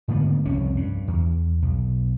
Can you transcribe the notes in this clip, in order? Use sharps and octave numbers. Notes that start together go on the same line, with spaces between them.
G#2 D3 A3 B3
C2 F2 C3 C#4
G2
E2
B1